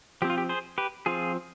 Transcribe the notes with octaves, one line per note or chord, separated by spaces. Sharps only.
F3 C4 G4
F4
G4
G#4 C5
G4 B4
F3 C4 F4 G#4